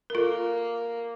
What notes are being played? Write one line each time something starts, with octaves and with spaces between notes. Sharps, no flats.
A#4
A#3 F4 A4